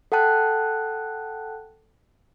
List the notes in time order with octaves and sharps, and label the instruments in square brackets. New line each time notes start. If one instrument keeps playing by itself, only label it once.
[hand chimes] A4 F#5 G5 A5 F#6